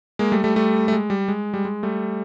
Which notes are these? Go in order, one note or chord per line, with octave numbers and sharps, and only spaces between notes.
G#3 A#3
G3 A3
G3 A3
G3 A3
A3
G#3
G3
G#3
G3
G#3
G3 A3